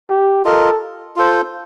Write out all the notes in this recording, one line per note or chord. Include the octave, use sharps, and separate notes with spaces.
G4
F4 A4 A#4 D#5
F4 A4 C5